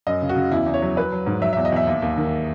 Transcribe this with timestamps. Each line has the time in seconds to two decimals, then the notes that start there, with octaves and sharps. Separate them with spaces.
0.07 F#2 D#5
0.22 C#3
0.29 F#4
0.36 C#3
0.52 E2 E4
0.66 E2
0.74 C#5
0.82 F#3
0.97 F#3 B4
1.12 F#3
1.26 G#2
1.42 F#3 E5
1.53 E5
1.57 E2
1.65 D#5
1.72 E2 E5
1.87 D#2
2.02 D#2
2.17 D#3